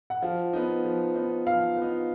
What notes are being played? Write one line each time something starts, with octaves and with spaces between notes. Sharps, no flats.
F#5
F3 F5
B3 D#4
F3
B3 D#4
F3 F5
B3
D#4